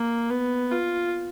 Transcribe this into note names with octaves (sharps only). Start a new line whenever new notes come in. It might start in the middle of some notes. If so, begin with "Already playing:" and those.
Already playing: A#3
B3
F4